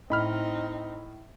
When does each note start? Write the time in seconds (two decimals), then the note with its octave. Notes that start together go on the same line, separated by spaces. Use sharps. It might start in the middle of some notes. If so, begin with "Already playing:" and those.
0.10 A2 C4 D#4 D#5 B5 F6